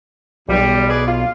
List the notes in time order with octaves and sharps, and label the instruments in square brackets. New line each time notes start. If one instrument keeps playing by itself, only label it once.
[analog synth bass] B1 [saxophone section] E2 G3
[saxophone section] G#4 B4 D5
F4